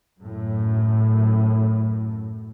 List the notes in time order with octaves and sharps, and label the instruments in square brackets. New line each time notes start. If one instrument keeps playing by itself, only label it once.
[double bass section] F#2 A2